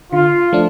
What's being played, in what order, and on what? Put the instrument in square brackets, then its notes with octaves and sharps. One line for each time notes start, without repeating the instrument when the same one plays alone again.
[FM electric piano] D3 [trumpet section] F4
[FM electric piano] F3 A3 D4